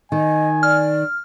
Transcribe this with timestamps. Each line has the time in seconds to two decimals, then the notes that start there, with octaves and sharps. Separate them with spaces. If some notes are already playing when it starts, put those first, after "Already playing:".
0.12 D#3 D#5 G#5
0.63 D5 F6